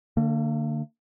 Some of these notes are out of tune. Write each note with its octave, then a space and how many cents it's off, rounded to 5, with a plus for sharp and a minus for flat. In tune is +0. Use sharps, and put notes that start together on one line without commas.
D3 +15 A#3 -35